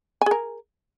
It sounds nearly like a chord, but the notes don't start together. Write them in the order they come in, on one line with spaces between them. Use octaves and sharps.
G#5 G#4 A#4